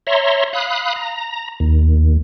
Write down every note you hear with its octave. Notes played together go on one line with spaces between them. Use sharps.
C#5 E5 A#5 C6
F5 B5 D#6 F#6
A#5
D#2